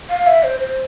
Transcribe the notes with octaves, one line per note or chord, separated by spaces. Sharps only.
F5
E5
C5
C5